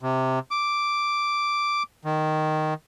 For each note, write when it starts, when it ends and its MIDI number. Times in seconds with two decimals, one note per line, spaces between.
0.02 0.39 48
0.51 1.83 86
2.05 2.74 51